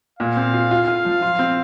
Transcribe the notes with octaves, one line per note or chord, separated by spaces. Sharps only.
A#2 F5
C4
F4
F4
F4
F3
F4
C4